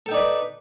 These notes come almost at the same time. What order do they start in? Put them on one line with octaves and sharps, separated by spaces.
A4 G5 D#4 D5 B4